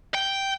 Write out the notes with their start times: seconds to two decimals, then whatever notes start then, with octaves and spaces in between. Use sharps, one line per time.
0.14 G5